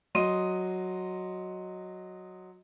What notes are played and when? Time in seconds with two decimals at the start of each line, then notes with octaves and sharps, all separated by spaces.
0.15 F#3 D#5 C6 D#6 D#7